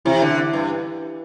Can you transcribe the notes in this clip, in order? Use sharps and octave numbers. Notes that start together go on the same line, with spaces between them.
C3 E3
D3
G2